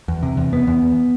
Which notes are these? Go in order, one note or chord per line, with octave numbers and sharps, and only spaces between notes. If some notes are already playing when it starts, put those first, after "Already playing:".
E2
C3
E2
E2 B3
E2
E2